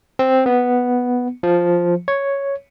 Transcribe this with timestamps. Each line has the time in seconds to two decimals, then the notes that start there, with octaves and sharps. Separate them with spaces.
0.19 C4
0.46 B3
1.43 F3
2.08 C#5